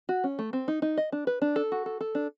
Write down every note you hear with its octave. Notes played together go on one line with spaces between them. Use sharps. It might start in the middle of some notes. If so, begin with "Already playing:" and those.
F#4
C#4
A3
C4
D#4
D#4
D#5
D4
B4
D4
A4
F#4
A4
A4
D4